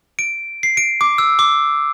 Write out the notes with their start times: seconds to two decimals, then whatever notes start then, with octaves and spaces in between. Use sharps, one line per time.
0.19 D7
0.63 C7
0.77 D7
1.01 D6
1.18 E6
1.39 D6